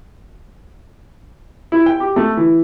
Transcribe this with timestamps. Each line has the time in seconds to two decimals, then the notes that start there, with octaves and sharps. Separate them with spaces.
1.72 E4
1.86 G5
2.00 G4
2.16 A3
2.37 E3